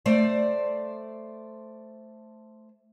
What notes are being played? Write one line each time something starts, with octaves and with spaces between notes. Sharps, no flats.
A3 C5 D5